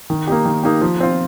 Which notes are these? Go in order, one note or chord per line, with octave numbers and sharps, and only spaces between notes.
D#3
A#3 D#4 G4
D#3
A#3 D#4 G4
F3
C4 F4